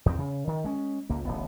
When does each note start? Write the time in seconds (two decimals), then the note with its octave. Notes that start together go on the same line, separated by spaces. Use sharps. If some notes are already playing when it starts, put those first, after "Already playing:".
0.06 E2 C4
0.18 C#3
0.47 D#3
0.64 G#3 C#4
1.10 C#2 A#3
1.25 D1 A1 B3